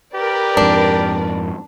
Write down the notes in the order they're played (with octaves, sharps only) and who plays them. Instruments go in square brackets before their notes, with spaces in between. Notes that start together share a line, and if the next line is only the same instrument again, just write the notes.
[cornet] G4 [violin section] A#4 B4 D5
[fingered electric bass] F2 G#2 [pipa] D4